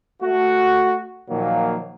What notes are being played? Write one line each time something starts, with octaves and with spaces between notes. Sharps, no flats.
A3 F#4
A#2 D#3 F3 F#3 A#3